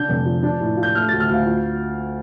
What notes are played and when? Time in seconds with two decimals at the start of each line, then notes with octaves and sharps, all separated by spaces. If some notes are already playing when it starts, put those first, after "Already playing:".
Already playing: D3 D4 G6
0.09 F1
0.25 F3
0.43 D4
0.60 A2
0.77 F4
0.83 G6
0.95 A3 F6
1.08 A6
1.12 D2
1.20 F6
1.30 D2 F5
1.46 F4